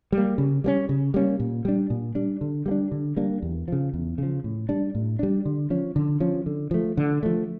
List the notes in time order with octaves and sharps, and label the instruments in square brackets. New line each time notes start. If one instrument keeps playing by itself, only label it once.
[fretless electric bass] G3 A#3
C#3
G3 A#3 C#4
C#3
G3 A#3 C#4
A#2
G3 D4
A#2
G3 D4
D3
G3 A#3
D4
D3
G3 A#3 D4
E2
C#3 F3
E2
C#3 F3
A2
G3 D4
A2
G3 D4
D3
F3 C#4
D3
F3 C#4
D3
F3 A3
D3
F3 A3